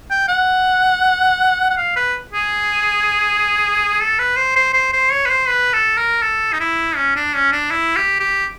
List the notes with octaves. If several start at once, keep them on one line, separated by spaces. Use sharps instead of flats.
G5
F#5
F#5
F5
B4
G#4
A4
B4
C5
C5
C5
C5
C#5
B4
C5
B4
A4
A#4
A4
D#4
E4
C#4
D4
C#4
D4
E4
G4
G4